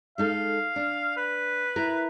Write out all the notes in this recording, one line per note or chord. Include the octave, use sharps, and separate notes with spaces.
G#3 D#4 A4 F5
D4
B4
E4 A#4